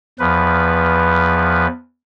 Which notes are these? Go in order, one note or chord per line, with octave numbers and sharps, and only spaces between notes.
E2 F3 B4